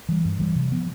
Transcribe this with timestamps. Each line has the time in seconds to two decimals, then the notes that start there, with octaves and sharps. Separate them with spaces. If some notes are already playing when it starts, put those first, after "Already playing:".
0.09 E3 G3
0.25 G2
0.40 E3 G3
0.56 C3
0.71 F3 B3